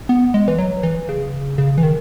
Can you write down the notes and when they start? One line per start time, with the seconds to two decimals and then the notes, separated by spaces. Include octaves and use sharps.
0.09 B3
0.34 G#3
0.48 E3
0.58 F#3
0.83 E3
1.09 C#3
1.58 C#3
1.78 E3
1.83 D#3